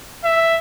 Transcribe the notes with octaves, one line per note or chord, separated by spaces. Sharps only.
E5